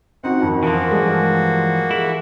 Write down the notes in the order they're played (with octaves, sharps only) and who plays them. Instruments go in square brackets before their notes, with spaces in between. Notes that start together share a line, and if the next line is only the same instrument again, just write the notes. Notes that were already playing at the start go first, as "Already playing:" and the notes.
[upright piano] C4 D#4 F#4 [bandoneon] F#5
[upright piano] F2 D#3
[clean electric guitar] E3 F3 [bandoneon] A#3 F#4 [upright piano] A#4
[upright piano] G2 G#3
[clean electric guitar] E4 [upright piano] G#4